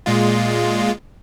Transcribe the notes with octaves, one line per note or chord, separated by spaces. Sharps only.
A#2 G#3 F4